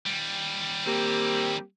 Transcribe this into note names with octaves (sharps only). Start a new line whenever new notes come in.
D#2 G3
A#3 C4 G4